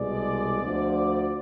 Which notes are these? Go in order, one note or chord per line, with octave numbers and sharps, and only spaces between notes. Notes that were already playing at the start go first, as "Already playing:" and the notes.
Already playing: C2 B2 G#3 D5
D2 D3 F3